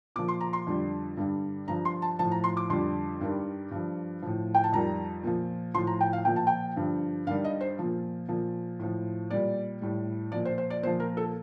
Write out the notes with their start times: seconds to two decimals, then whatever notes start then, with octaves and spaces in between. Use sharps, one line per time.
0.16 A#2 D6
0.19 F3
0.28 C6
0.40 A#5
0.53 C6
0.67 F2 D3 G3
1.17 G2 D3 G3
1.68 G2 F3 A#5
1.85 C6
2.02 A5
2.19 A2 F3 A5
2.31 A#5
2.44 C6
2.57 D6
2.70 F2 D3 G3 C6
3.21 G2 D#3 G3
3.71 G2 F3
4.22 A2 F3
4.55 G5
4.64 A5
4.73 F2 D#3 G3 A#5
5.23 A#2 F3
5.74 F3 C6
5.77 A2
5.87 A#5
6.01 G5
6.13 F5
6.25 A#2 F3 G5
6.36 A5
6.47 G5
6.76 G2 D3 F3
7.27 G2 D#3 G3 F5
7.44 D#5
7.61 C5
7.79 A#2 F3
8.29 A#2 F3
8.79 A2 F3
9.30 A#2 G3 D5
9.81 A2 G3
10.32 A#2 F3 D5
10.45 C5
10.58 C5
10.70 D5
10.83 A#2 C5
10.87 F3
11.00 A#4
11.17 A4